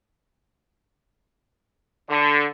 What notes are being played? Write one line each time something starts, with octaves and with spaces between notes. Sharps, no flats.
D3